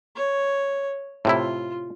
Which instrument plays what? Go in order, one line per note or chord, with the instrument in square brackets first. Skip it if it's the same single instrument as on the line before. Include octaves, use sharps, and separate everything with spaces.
[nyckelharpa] C#5
[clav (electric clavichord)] A2 C3 E4 [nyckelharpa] F4